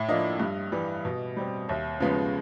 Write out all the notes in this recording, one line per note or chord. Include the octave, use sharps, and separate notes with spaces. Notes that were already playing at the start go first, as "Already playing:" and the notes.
Already playing: A2 E5
F3 A#3 D4 D#5
G2
E3 G3
B2
G3 C4
D#2 E5
C#3 F3 G#3 B3